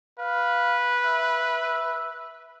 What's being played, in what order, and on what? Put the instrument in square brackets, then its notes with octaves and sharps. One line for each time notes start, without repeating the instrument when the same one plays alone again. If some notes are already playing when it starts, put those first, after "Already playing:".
[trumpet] B4 [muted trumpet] F5
[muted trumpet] E5